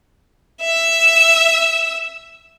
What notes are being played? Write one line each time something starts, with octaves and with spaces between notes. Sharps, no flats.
E5 E6